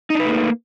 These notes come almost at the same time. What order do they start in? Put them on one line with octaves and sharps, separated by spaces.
D#4 D4 B4 A3 A#3